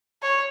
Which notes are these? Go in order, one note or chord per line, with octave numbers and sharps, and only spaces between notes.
C#5